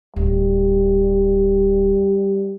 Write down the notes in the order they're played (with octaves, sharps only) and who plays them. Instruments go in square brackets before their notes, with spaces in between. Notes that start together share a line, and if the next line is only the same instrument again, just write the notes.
[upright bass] D1 [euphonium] G3